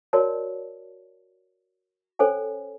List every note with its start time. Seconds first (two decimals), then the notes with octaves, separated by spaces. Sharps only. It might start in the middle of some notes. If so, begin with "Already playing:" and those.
0.13 F#4 A#4 C#5 D5 A5
2.19 C#4 A4 C5 C#5 G#5